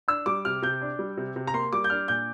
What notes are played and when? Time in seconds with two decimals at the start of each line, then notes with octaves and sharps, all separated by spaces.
0.08 D4 E6
0.26 G3 D6
0.45 C3 F6
0.62 C3 G6
0.82 D4
0.99 G3
1.17 C3
1.36 C3
1.47 A#5
1.54 A#3 C6
1.73 G3 D6
1.84 G6
1.90 D4 F6
2.08 A#2 G6